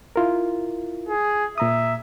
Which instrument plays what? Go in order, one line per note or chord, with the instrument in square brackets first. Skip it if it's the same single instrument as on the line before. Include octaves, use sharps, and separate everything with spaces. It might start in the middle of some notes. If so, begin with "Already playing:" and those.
[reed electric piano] E4 F4 A#4
[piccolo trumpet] G#4
[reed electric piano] A#2 A#5 D#6 [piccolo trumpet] E5